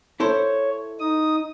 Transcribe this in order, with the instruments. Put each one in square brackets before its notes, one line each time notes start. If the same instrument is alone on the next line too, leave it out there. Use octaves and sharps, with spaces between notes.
[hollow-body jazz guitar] E4 A4 C5 [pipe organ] C#5
[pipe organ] D#4 D#6